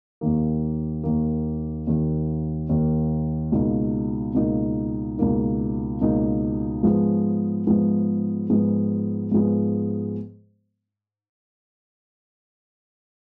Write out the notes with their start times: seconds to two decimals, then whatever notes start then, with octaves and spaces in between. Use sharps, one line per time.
0.21 D#2 D#3 A#3
1.04 D#2 D#3 A#3
1.87 D#2 D#3 A#3
2.69 D#2 D#3 A#3
3.52 C#2 B2 A#3 D#4
4.35 C#2 B2 A#3 D#4
5.18 C#2 B2 A#3 D#4
6.01 C#2 B2 A#3 D#4
6.83 G#2 F3 G#3 B3
7.67 G#2 F3 G#3 B3
8.50 G#2 F3 G#3 B3
9.32 G#2 F3 G#3 B3